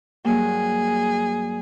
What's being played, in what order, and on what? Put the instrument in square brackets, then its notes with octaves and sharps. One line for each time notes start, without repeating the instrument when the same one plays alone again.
[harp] G2 F#3 A#3 [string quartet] G#4